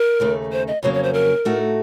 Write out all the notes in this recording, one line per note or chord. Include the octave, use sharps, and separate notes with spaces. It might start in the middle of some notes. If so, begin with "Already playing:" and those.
Already playing: A#4
D#2 C#3 A3 D#4
C5
D#5
F2 C#3 F#3 A#3 C#5
C#5
C5
A#4
A2 A3 D#4 F#4